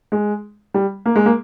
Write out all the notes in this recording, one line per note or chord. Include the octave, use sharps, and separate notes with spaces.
G#3
G3
A#3
G#3
A#3